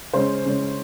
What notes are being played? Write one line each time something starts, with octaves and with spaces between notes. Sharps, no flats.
C#3 G#3 C#4 C5
C#3 G#3 C#4